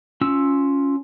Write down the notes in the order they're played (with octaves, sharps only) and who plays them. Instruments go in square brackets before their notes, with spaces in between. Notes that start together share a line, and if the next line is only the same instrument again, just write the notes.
[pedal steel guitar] C#4 F4 E6